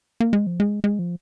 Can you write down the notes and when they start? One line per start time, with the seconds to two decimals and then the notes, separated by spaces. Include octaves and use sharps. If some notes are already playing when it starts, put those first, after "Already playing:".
0.20 A#3
0.33 G#3
0.47 F3
0.60 G#3
0.84 G#3
0.99 F3